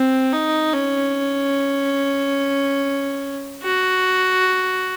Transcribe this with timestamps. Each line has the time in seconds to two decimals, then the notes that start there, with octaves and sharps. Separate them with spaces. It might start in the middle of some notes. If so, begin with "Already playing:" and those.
Already playing: C4
0.33 D#4
0.74 C#4
3.63 F#4